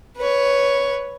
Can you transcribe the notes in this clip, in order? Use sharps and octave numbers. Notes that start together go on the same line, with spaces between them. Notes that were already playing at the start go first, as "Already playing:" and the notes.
B4 C#5